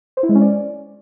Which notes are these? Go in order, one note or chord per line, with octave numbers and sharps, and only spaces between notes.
C5
E4
G#3
C#4
D5